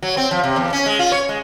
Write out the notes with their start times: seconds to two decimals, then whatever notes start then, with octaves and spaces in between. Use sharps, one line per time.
0.03 F#3
0.17 C4
0.31 F3
0.43 C3
0.56 E2
0.73 C#4
0.86 G#3
0.99 F4
1.12 C#5
1.29 G#3